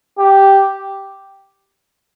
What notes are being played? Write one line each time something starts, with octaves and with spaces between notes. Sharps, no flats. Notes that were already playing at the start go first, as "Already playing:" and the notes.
G4